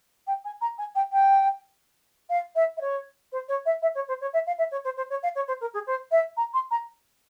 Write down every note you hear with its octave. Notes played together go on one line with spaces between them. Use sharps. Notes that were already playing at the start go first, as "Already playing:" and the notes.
G5
G#5
A#5
G#5
G5
G5
F5
E5
E5
C#5
C5
C#5
E5
E5
C#5
C5
C#5
E5
F5
E5
C#5
C5
C5
C#5
F5
C#5
C5
A#4
G#4
C5
E5
A#5
C6
A#5